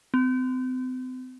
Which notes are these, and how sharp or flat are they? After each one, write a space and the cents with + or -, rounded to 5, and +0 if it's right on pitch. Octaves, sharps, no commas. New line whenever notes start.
C4 -40